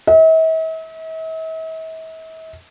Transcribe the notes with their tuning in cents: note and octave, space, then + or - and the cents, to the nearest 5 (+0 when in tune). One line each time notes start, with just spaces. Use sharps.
E5 -45